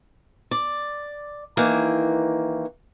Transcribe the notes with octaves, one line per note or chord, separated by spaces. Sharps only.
D5
D#3 E3 A#3